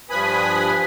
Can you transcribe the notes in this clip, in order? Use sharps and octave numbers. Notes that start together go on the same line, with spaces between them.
G2 F3 B4 G#5 B5 D#6